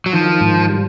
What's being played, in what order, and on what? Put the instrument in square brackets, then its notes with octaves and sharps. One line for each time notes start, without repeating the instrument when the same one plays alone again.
[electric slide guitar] F#3
[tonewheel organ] D#3 [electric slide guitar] F3
[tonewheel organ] G#2
G3